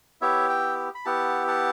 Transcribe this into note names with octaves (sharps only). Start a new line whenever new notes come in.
B3 E4 G4 C#5 E5
E5 G5
B5
B3 E4 G4 F#5 A5
F#5 A5